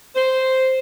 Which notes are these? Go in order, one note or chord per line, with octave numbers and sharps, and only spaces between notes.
C5